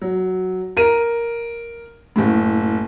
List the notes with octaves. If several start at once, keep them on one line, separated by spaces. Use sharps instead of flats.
F#3
A#4 D#7
F#1 A2